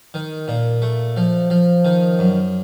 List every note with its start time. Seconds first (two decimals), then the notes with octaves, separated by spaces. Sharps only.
0.14 D#3
0.48 A#2
0.82 A3
1.17 F3
1.50 F3
1.85 D#3
2.19 F#2